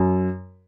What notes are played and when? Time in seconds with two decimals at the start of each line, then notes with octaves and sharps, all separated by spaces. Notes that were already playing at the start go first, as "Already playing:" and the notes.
Already playing: F#2